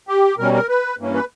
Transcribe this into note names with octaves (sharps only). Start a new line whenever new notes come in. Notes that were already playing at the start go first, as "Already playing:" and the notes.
G4
B2 G3 C#4 A#4
A#4
B4
G2 E3 A#3 C#4
B4